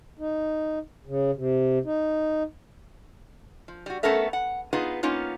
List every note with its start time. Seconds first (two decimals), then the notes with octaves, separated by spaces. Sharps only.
0.19 D#4
1.06 C#3
1.36 C3
1.85 D#4
3.68 F3
3.86 G3 F#4
4.03 A3 B3 C#4 A4 A#4 E5
4.33 F#5
4.73 B3 D#4 F4 G#4 B4
5.03 A#3 B3 C#4 D#4 F4